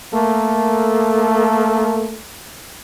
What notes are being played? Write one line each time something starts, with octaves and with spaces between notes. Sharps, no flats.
A3 A#3 A4 A#4